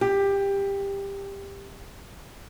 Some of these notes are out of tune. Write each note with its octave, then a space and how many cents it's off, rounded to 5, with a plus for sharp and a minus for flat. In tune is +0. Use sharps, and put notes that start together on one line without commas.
G4 +15